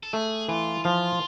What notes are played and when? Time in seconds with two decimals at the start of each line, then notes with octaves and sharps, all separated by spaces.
0.03 A4
0.13 A3 G#4
0.49 E3 F4
0.84 F3 F4